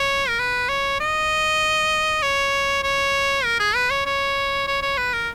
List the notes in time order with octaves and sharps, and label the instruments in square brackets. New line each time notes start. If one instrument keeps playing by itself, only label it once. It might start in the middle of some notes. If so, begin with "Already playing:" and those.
Already playing: [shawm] C#5
A#4
B4
C#5
D#5
C#5
C#5
A#4
G#4
B4
C#5
C#5
C#5
C#5
B4
A#4